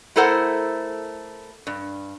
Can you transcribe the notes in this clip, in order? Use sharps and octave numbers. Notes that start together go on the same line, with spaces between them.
A3 E4 A4 A#4 C5 F#5
G2